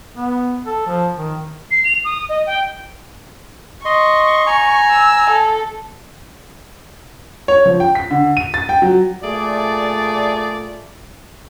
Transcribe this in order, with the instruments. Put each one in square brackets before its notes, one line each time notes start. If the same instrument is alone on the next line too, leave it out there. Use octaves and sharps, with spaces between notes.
[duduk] B3
A4
F3
D#3
[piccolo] C7
F7
D#6
D#5
G5
[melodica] D#5 C6 [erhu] C#6
[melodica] G#5 A#5
[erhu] E6
A4
[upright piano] C#5
F3
G5
B6
D3
D#7
A6
G5
F#3
[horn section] A#2 A3 G#4 D5